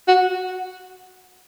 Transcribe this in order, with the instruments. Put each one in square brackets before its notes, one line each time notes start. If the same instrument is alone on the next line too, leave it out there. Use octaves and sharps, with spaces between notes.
[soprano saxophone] F#4